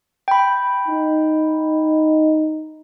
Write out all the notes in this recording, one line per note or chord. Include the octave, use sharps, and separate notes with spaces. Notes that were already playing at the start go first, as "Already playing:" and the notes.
G5 B5
D#4